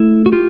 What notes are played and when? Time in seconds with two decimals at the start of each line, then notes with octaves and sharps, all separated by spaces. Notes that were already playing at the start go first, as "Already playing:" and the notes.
Already playing: A3 E4
0.26 F#4
0.32 F4 G4